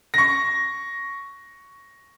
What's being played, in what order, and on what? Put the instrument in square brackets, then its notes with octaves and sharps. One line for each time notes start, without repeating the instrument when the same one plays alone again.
[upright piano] C#6 A#6